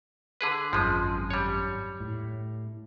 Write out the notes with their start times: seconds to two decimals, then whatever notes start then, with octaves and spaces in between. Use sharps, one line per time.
0.41 D3 G#4 B4
0.73 G#1 F#2 F3 G#3
1.30 G3 C#5
2.00 A2